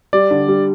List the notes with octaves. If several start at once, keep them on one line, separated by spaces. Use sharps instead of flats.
G3 D5
D3
G3